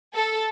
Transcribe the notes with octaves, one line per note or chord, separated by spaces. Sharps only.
A4